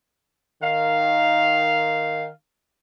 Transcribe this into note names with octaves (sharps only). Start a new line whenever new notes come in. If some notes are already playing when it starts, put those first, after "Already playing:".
D#3 F5